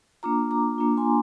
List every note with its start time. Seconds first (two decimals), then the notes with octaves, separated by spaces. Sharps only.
0.23 A#3 D4 F4 A#5 D6
0.51 A#5 D6
0.78 A#3 D4 F4
0.97 G#5 C6